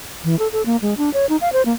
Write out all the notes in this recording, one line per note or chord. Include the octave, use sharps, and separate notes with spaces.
E3
A4
A4
A#3
G#3
D4
C#5
D#4
F5
C5
A#3